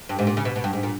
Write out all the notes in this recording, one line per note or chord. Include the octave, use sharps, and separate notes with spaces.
G2
G#2
A#2
C#3
B2
B2
G2
G#2
A#2